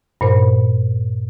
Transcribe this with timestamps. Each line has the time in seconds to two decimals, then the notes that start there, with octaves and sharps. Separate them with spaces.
0.21 G2 A#2 C5